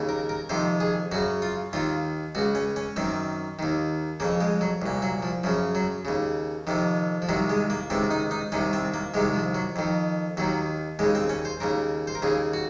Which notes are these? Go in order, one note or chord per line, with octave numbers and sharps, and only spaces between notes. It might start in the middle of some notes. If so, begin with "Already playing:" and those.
Already playing: D#2 C#3
A#4
A#4
F2 C3 D#3 C5
G#4
F#2 C#3 F#4
F4
D#2 D#3 F4
C#2 C#3 F#4
C#4
C#4
F#2 D#3 C4
D#2 D#3
F2 C#3 A#3
G#3
F#3
C2 A#2
F#3
F3
F#2 C#3 F3
F#3
D#2 C#3
F2 C3 D#3
F3
C2 C3 D#3 F#3
G#3
A#3
C#2 C3 D#3 C4
D#4
D#4
C2 C3 D#3 C#4
C4
A#3
C2 C3 D#3 G#3
F3
F#3
F2 D#3
D#2 D#3 F#3
D#2 C#3 G#3
C4
C#4
C5
D#2 C#3 A#4
C5
A#4
D#2 C#3 G#4
F#4